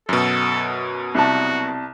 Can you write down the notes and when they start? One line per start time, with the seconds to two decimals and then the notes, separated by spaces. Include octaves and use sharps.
0.09 F#2 B2 A4
1.15 C2 F#4 A5